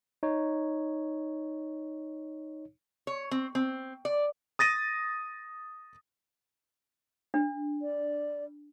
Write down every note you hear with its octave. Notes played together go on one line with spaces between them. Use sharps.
D#4 C#5
C#5
C4
C4
D5
D#6 A6 A#6 D#7
D4
D5